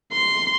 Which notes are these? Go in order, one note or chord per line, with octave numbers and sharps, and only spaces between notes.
C6